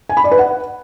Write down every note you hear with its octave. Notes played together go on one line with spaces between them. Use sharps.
G#5
B5
D5
B4
F#5